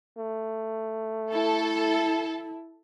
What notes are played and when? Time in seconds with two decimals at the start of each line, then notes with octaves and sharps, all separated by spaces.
0.18 A3
1.33 E4 A4